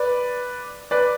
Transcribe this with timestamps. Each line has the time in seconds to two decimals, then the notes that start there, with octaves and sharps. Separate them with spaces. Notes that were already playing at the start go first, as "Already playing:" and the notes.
Already playing: B4 D5
0.91 B4 D5